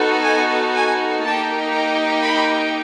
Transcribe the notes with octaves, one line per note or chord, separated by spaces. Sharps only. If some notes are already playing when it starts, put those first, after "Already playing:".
Already playing: B3 D#4 F#4 A4
G#5
G#5
A#3 D#4 G4 A5
A#5
B5